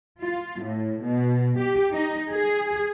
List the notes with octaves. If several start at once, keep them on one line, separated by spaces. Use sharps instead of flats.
F4
A2
B2
G4
D#4
G#4